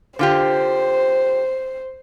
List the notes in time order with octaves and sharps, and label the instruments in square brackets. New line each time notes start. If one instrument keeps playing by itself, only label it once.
[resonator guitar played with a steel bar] D3 F4 G4 [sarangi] C5